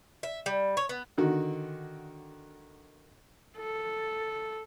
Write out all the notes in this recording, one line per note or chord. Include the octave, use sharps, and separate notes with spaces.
E5
G3
C#5
B3
D3 D#3 F#4
A4